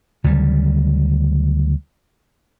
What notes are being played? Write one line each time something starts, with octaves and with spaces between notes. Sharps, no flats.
D2 C#3 F#3 G3